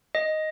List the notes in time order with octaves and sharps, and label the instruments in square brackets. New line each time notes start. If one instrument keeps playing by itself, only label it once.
[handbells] D#5